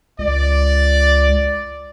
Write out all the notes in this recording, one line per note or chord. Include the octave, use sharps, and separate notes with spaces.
C#2 D5